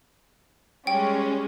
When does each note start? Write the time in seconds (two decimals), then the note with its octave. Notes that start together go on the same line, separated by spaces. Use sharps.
0.87 G3 G#3 C#4 G5